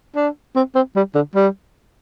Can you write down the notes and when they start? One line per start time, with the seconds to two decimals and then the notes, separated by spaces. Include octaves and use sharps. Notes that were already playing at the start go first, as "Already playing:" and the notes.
0.16 D4
0.56 C4
0.75 C4
0.96 G3
1.15 D3
1.35 G3